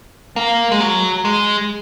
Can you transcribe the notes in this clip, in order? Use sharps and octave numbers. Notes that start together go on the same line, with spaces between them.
A#3
G#3
F#3
G#3